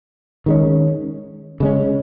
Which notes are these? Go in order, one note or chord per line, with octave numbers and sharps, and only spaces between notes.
D#3 G#3 C#4
C#3 G#3 C#4